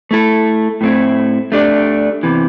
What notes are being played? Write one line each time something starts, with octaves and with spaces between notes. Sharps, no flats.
A3 E4 A4
A2 A3 C4 E4
A3 D4 G4 D5
E2 C3 E3